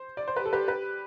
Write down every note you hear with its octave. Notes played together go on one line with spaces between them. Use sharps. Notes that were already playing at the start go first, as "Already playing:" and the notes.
Already playing: C5
D5
C5
G4 B4
A4
G4 B4
G4 B4